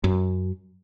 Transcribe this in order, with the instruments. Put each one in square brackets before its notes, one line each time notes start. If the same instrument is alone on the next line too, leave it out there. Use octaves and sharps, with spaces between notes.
[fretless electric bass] F#2